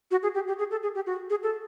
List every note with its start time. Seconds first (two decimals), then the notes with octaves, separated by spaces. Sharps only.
0.11 F#4
0.23 G#4
0.35 G4
0.48 G4
0.59 G#4
0.71 A4
0.83 G#4
0.95 G4
1.07 F#4
1.30 G#4
1.43 A4